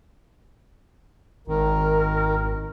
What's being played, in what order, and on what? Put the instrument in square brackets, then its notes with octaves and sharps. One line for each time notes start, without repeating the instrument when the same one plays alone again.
[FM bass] G#1 [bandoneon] D#3 [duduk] A#4